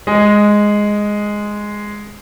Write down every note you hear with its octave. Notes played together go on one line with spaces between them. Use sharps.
G#3